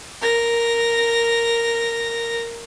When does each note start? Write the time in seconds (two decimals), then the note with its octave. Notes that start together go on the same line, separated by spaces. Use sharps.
0.21 A#4 A#6